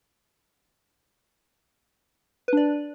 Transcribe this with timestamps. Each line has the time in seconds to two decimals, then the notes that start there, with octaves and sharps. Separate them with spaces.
2.48 B4
2.53 D4
2.57 D5